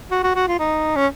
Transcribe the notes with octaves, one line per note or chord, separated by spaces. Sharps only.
F#4
F#4
F#4
F4
D#4
C#4